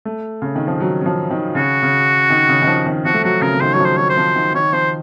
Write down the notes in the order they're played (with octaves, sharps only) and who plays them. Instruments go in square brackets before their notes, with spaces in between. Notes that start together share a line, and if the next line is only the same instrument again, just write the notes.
[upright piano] A3
C#3
D#3
F3
F#3
F#3
F3
D#3
[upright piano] C#3 [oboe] F#4
[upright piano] C#3
D#3
C#3
D#3
F3
D#3
[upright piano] F3 [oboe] F#4
[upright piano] A3
[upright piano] F#3 [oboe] F#4
[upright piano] C#3 [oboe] A#4
[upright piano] C#3
[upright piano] D#3 [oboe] C5
[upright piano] F#3 [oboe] C#5
[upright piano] F3
[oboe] C5
[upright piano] F#3 [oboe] C#5
[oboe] C5
[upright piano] F3
D#3
[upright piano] D#3 [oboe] C#5
[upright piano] F3 [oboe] C5